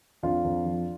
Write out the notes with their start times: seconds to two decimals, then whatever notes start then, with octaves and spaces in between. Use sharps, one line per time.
0.23 F2 D4 F4
0.44 F2
0.65 F3